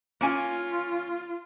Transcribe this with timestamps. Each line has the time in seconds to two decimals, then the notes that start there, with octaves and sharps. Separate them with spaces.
0.21 A#3 C#4 F4 G#5